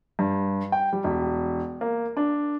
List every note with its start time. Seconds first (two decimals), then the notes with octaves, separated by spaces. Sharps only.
0.19 G2
0.72 G5
0.93 G3
1.04 E1
1.81 A#3
2.17 D4